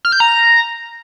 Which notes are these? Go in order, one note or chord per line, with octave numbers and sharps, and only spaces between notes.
F6
G6
A#5